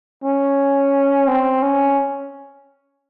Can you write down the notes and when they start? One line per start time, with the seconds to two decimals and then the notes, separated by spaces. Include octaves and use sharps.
0.24 C#4
1.28 C4
1.62 C#4